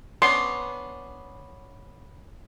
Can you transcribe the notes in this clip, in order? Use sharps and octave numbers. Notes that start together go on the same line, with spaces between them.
B3 C#4 D4 C6